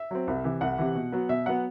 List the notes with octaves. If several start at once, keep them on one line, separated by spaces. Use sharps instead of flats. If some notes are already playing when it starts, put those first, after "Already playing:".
Already playing: E5
F#3 C4
C2
C3 E3
C2 F#5
C3 E3
B2
F#3 B3
B2 E5
F#3 B3 F#5